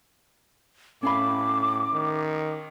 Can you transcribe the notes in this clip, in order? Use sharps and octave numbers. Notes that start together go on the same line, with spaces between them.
A2 C#4 F5 B5 D6
D#3